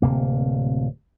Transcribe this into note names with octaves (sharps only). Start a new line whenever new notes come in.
D1 C3 A#3